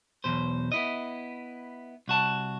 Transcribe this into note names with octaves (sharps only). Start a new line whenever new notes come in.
B1 E2 B2 C5
B3 E4 D#5
C2 F#4 A5